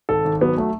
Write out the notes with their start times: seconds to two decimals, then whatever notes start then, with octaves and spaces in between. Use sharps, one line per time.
0.09 G#1 A4
0.25 G#1
0.41 F#3 B3
0.58 A3